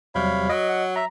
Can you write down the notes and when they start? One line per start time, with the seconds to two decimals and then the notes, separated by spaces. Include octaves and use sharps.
0.15 E2 C3 F#3 G3 C#5 F5 B5
0.49 F#3 D#5
0.69 F#5
0.96 E5 A#5